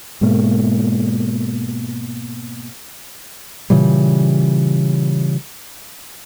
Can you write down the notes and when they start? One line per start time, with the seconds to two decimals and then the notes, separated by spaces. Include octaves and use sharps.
0.21 G#2 B2 G#3 A#3
3.70 A#2 C#3 E3 G3